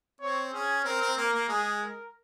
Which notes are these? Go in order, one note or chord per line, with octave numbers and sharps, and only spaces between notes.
C4 C#5
C#4 G#4
C4 A#4
C4
A#3 A#4
A#3
G#3 G#4
A#4